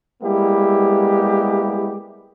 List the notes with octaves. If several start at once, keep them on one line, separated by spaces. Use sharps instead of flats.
G3 G#3 A#3 B3 E4 G4